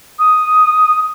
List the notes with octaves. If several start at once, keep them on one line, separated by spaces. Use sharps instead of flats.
D#6